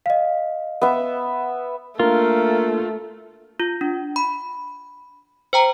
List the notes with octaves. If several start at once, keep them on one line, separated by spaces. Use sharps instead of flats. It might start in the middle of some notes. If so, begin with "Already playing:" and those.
D#5 F5
B3 E5
A3 A#3 D4 F4 A#4
F4
D4
B5
C5 G5 A#5